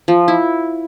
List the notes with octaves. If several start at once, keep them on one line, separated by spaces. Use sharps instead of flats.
F3
E4